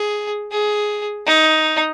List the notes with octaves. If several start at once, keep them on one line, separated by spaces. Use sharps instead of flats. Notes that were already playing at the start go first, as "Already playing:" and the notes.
Already playing: G#4
G#4
D#4